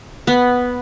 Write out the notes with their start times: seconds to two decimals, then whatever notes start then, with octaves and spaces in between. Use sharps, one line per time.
0.27 B3